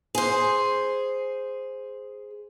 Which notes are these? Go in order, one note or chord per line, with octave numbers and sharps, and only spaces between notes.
G#4 C5